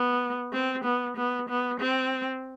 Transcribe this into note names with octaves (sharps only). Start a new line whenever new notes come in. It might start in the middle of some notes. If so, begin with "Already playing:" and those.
Already playing: B3
C4
B3
B3
B3
C4